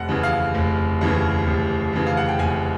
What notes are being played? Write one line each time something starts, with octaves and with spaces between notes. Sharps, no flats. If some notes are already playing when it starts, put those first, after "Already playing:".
Already playing: F1 F#5
D#2 C#3 E3
F5
F1
D#2 C#3 E3
F1
D#2 C#3 E3
F5
F#5
G5
F1 G#5